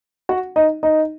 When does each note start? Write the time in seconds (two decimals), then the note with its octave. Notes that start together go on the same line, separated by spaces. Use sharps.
0.29 F#4 F#5
0.56 D#4 D#5
0.83 D#4 D#5